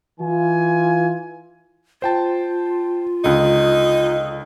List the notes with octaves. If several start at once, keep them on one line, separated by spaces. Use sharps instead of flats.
E3 F4 G#5
F4 C5 G5 A5
C#2 D3 D#4